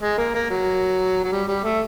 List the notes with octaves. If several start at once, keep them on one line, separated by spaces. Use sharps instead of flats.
G#3
A#3
A#3
F#3
F#3
G3
G3
A3